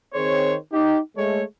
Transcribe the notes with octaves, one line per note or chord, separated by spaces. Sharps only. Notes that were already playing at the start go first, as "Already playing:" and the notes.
D#3 C4 G#4 C5 C#5
D#4 G4
G#3 A3 C#5